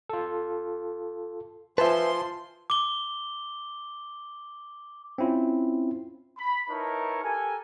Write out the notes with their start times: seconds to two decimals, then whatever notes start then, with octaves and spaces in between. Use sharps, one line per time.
0.09 F4 A4
1.78 F3 B4 C5 E5 G#5 A5 C6
2.70 D6 G7
5.18 C4 C#4 E4 F4
6.38 B5
6.70 D#4 E4 A#4 B4 C#5 A5
7.23 G4 A4 A#4 G#5